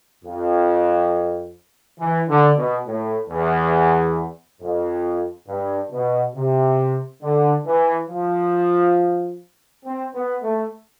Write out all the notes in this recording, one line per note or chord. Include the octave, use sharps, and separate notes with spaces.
F2
E3
D3
B2
A2
E2
F2
G2
B2
C3
D3
E3
F3
C4
B3
A3